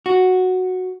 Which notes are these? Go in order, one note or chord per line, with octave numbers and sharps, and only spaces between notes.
F#4